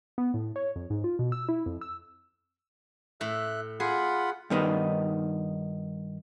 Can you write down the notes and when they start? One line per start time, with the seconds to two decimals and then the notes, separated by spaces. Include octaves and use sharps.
0.18 B3
0.34 A2
0.56 C#5
0.76 F2
0.90 G#2
1.04 F4
1.19 B2
1.32 E6
1.49 E4
1.66 F2
1.81 E6
3.21 A2 E5 F#6
3.80 F4 G#4 F#5 B5
4.50 G2 D#3 B3 D#4